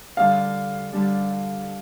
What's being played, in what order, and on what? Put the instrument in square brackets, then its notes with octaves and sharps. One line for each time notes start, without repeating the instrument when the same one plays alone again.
[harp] D3 G3 D4 [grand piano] F5
[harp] D3 G3 D4